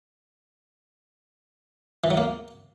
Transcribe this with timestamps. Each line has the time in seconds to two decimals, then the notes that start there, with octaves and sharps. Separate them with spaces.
2.04 E3
2.11 F#3
2.17 A#3